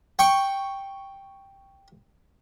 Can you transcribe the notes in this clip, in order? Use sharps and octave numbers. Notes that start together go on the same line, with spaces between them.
G5 C#6